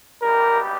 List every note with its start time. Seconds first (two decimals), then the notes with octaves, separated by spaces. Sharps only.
0.22 G#1 G2 G3 B3 G4 A#4